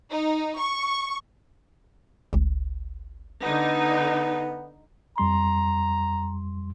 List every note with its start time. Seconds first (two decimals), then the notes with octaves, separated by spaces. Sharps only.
0.12 D#4
0.59 C#6
2.33 G1 C#2
3.43 D3 B3 D#4
5.18 F2 G3 A#5 C6